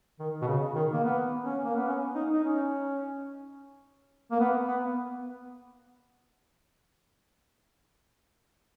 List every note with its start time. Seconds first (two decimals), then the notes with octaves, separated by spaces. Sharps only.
0.19 D#3
0.42 B2
0.47 C#3
0.75 D#3
0.93 A#3
1.04 B3
1.45 C#4
1.64 A#3
1.76 B3
1.87 C#4
2.15 D#4
2.33 D#4
2.44 C#4
4.31 A#3
4.40 B3
4.67 B3